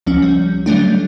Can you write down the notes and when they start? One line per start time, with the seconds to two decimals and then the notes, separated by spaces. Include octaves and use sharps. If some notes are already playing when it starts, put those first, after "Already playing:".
0.06 C#2 F3 C#4
0.22 G3
0.66 D3 F#3 G3 A3 C#4 D4